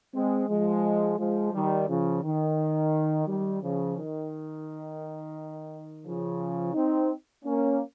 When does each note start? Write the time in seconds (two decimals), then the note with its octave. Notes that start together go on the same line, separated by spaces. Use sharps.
0.13 G#3 C4
0.48 F3 G#3
1.17 F3 G#3
1.52 D#3 G3
1.87 C#3 F3
2.23 D#3
3.26 D#3 G3
3.61 C#3 F3
3.95 D#3
6.04 C#3 F3
6.74 C4 D#4
7.44 A#3 C#4